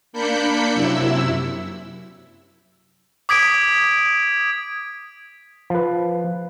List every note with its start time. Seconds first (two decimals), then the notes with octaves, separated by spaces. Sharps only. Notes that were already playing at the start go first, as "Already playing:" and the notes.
0.13 A#3 D4 B5 G6 B6 C#7
0.74 F#2 C3 E4 E6
3.29 D6 D#6 G#6 B6 D7
5.70 F3 B4